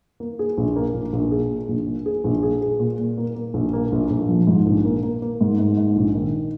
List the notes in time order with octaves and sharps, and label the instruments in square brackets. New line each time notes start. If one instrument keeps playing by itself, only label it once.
[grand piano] A#3
G#4
A#1
A#3
A#1
A#1
G#4
A#2
A#1
A#2
G#4
A#1
G#4
G#4
A#2
A#2
A#3
A#3
A#1
A#3
A#1
A#1
F3
G#2
A#1
A#3
A#3
A#3
G#2
G#2
G#2
A#1
D#3